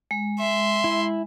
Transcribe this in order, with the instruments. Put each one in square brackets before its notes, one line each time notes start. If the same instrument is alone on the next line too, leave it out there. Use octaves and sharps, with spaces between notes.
[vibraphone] G#3
[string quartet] E5 [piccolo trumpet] C6
[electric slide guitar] E4